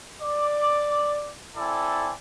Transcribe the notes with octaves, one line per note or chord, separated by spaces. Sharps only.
D5 D6
C4 E4 A4 D5 G#5